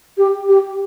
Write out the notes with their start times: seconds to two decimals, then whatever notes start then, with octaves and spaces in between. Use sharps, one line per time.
0.18 G4
0.49 G4